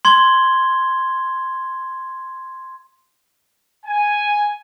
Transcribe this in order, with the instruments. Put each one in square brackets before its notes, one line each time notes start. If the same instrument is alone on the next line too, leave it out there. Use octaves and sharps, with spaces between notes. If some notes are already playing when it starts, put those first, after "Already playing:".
[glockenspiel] C6 G#6 G7
[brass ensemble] G#5